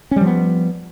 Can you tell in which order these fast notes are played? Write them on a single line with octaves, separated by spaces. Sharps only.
C#4 G3 F3 B3